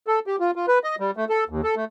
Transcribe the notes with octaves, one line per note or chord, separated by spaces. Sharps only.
A4
G4
F4
F4
B4
D#5
G3
A3
A4
D#2
A4
A3